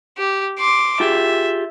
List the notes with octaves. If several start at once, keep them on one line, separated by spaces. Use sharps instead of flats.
G4
C6 D6
F4 G4 G#4 E5